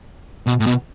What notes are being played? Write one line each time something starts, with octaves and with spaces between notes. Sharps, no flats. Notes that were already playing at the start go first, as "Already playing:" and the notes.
B2
A2
B2